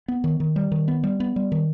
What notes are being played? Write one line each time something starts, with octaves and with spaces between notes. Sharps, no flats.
B3
D#3
D#3
G3
D#3
B3
G3
B3
G3
D#3